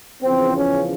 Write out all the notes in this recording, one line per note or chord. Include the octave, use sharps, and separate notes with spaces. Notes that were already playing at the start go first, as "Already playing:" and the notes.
E2 C#3 F3 C4
C#4